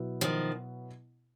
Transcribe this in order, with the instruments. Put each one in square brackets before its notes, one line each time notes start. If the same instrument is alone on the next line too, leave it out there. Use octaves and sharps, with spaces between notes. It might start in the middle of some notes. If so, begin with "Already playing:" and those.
Already playing: [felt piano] B2 F#3 B3 E4
[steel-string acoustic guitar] D#3 F3